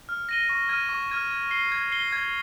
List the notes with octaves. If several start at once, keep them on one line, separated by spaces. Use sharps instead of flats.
F6
A#6 D#7 G7
C#6
F6 G#6 D#7
C#6
F6 G#6 D#7
G#6
C7 G7
G#6
C7 G7
G#6